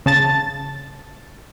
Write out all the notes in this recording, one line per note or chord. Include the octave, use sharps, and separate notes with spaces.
C#3 A5 A6